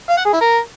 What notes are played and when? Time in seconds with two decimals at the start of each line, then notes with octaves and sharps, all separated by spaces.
0.09 F5
0.17 F#5
0.25 G#4
0.33 E4
0.41 A#4